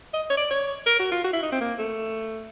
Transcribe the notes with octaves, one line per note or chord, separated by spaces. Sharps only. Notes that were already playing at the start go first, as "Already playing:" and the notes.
D#5
C#5
D5
C#5
A#4
F#4
F4
F#4
E4
D#4
C4
A#3
A3